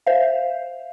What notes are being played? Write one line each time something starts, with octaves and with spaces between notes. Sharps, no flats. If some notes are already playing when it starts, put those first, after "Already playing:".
C5 E5 F5